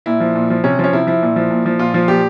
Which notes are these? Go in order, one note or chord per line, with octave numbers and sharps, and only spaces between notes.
A#2 E4
F3
A#2
F3
C3 C#4
F3
C#4
C3 E4
F3 E4
A#2
F3
A#2
F3
A#2 F4
F3
A#2 G4